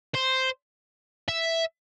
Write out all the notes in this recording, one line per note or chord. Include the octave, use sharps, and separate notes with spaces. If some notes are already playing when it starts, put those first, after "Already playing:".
C5
E5